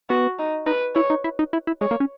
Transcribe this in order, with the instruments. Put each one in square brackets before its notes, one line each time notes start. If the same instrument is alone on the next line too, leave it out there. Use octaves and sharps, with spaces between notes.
[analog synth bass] B3 [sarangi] F#4
[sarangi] D#4
[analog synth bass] D#4 [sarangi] B4
[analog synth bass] E4 [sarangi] C#5
[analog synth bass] D#4
E4
D#4
E4
E4
[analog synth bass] G#3 [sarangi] C#5
[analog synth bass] A#3
C#4